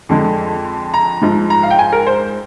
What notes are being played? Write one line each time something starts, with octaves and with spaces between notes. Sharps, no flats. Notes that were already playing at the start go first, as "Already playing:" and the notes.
F2 D3 G#3
A#5
G#2 F3 G#3
A#5
F5
G5
G#5
A#4
C5